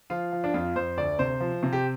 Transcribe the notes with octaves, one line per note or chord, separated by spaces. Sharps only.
F3 F4
F3
D4
F2 F4
F2 C5
D2 D5
C3 C5
F3
C3
G4